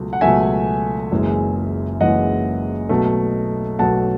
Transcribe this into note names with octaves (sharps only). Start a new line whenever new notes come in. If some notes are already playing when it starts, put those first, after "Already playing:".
Already playing: C#2 B2 F#3 A3
F#5
C#2 B2 F#3 A3 E5 G#5
F#1 F#2 E3 G#3
F#1 F#2 E3 G#3 D#5 F#5
B1 B2 F#3 A3
B1 B2 F#3 A3 F#5 A5